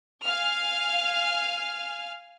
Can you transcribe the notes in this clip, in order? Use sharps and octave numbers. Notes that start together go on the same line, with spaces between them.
F5 G#5 F6